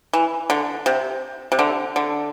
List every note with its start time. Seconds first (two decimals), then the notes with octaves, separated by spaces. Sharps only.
0.13 E3
0.50 D3
0.86 C3
1.52 C3
1.59 D3
1.96 D3